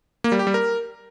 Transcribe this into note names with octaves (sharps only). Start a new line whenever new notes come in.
A#3
G3
G4
G3
A#4